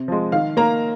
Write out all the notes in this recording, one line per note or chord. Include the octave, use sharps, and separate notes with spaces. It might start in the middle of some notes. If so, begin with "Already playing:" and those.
Already playing: C3
F3 G#3
D#3 F5
A#3 A#5